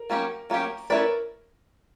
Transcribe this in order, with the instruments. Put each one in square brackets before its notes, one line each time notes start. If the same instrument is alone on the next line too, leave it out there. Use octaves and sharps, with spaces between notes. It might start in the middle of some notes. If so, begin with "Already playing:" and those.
Already playing: [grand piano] A#4
[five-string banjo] F#3 A#3 C#4 G4
F#3 A#3 C#4 G4
[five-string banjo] C#4 E4 B4 D5 [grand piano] A#4